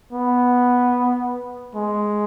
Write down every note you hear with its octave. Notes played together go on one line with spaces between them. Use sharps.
B3
G#3